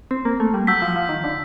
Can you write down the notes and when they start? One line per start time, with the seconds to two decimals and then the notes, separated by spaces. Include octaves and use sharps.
0.11 C4
0.25 A#3
0.40 A3
0.54 G3
0.67 F#3 E6 G6 B6
0.82 F3
0.96 F3
1.09 D#3
1.24 D3